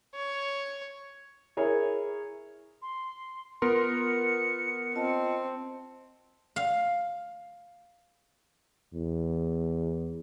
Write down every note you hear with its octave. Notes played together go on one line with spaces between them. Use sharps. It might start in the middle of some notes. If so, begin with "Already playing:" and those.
C#5
E4 G#4 A#4 C#5 G#5
C6
B3 F4 A#4 C6 C#7
C4 F4 D#5 A5
F5
E2